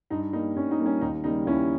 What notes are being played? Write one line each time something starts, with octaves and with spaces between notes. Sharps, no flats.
G2 D#4
G3 A#3 D#4
G2 C#4
D#4
G3 A#3
C#4
D#2 D#4
C#3 G3 A#3 D#4
D#2 C#4 E4